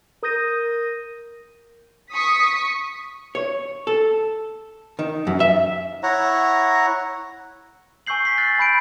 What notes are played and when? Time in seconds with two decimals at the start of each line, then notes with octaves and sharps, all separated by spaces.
0.23 A#4 D#6 G6 A#6 D#7
2.11 C#6 D#6 B6
3.35 C#5
3.87 A4
4.99 D#3
5.27 F#2
5.40 E5
6.03 E4 C#5 F#5 A#5
8.07 G#5 C#6 E6 G6 C7 F#7
8.25 B6 C7
8.38 F#6 A6
8.58 G#5 B5 G6 D7